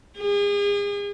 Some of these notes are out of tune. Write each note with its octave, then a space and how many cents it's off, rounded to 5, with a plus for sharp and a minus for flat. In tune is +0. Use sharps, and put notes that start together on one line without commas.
G#4 -40